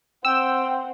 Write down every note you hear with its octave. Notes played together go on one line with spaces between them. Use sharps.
C4 F#5 G5 E6